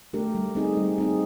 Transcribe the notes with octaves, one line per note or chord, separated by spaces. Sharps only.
A3 D4 G4 A#4
G3
C4 D#4 G#4
G3
C4 D#4 G#4